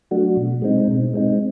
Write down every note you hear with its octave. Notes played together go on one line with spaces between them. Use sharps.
F#3 A3 D4 F#4
B2
G#3 C4 D#4
B2
G#3 C4 D#4